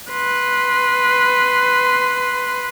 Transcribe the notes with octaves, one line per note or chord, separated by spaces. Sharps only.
B4 C6